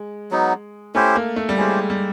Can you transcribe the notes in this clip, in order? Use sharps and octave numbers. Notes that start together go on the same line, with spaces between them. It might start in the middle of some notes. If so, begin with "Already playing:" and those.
Already playing: G#3
F#3 B3 D#4
A3 C#4 E4 G4 C5
A#3
A3
G3
G#3 C#4 E4 G4 C5
G3